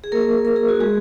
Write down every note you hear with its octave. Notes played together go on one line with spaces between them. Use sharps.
G#4
A#3 A#4
A#4
G#4
F#4
G#3 G#4